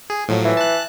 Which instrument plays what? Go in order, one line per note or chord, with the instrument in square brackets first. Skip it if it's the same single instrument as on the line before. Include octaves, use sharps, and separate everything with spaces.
[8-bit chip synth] G#4
A2 F3 F#3
[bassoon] E3
[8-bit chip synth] A5 F#6